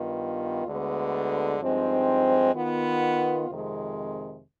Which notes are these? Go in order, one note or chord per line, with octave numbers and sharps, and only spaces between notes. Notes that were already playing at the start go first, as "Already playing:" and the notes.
Already playing: G2 D#3 B3 F4
D2 D3 G#3 B3
G2 F3 G#3 C4 D#4
D#3 B3 F4
F2 C3 D#3 G#3